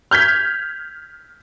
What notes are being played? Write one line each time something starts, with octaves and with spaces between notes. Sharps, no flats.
F6 G6 G#6 B6